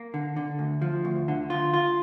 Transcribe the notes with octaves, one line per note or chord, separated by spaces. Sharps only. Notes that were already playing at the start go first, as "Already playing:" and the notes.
Already playing: A#3
D3
D3
D2
F3
D2
D3
F4
F4